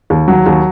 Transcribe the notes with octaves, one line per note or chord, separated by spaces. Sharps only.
D#2
F#3
D#2